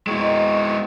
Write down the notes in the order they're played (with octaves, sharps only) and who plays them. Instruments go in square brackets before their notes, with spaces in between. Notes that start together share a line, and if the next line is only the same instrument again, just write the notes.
[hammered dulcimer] B2 C4 D#4 [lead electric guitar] G#3 E4 [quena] C#6